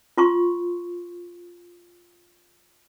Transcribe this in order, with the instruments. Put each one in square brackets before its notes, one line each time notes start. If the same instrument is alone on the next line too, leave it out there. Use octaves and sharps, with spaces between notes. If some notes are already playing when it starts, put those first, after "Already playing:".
[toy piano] F4 C6 C#6